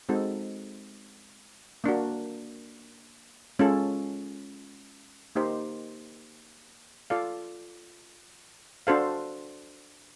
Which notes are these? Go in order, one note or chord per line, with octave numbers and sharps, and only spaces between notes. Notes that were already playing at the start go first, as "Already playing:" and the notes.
G#3 C4 D#4 F#4 A4
A#3 D4 F#4
G#3 C#4 F4 A4
A#3 D#4 G4 C5 D#5
F4 A4 D5 F5
D4 F#4 A4 C5 F5